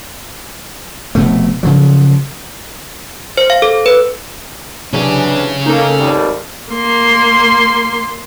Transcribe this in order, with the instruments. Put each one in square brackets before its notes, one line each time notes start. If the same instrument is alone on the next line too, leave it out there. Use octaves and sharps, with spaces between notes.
[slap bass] F1 B2 A3
C#3 F3 F#3
[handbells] C5
F5
A4
B4
[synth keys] C3 F#3 [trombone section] E3 D4 [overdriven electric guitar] C#4 G#4
[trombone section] A#3 [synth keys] D#4 A4
[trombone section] G#1 D#2 G3
[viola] A#3 C6